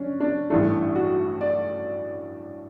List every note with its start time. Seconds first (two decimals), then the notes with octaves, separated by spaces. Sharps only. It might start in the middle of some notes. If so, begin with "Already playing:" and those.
Already playing: C#4 D4
0.20 D4
0.50 A1 G2 E3 A3 D4
0.95 F#4
1.41 D5